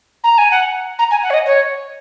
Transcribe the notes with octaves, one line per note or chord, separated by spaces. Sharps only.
A#5
G#5
F#5
A#5
G#5
F#5
C#5
D#5
C#5